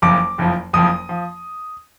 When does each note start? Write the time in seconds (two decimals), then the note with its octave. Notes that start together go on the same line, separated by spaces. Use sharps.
0.02 F#1 F2 F3 D6
0.38 F#1 F2 F3
0.73 F#1 F2 F3 D#6
1.09 F3